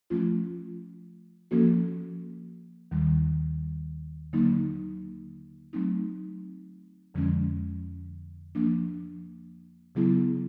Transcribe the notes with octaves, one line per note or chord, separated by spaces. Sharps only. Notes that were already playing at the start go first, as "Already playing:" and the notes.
F3 A3 C#4 F4
F3 A#3 C#4 F#4 A4
D#2 D#3 G3
D3 F#3 A#3 D#4
F#3 A3 C4 D#4
F2 D3 F3 G#3 C#4
F3 A#3 D4
C#3 F#3 B3 E4 G#4